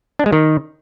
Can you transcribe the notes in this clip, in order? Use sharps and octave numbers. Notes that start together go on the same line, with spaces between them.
D4
G#3
D#3